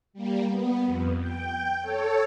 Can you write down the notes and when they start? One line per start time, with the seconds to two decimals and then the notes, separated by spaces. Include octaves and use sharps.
0.13 G3 A#3
0.48 B3
0.86 F2
1.20 G5
1.81 A4 C#5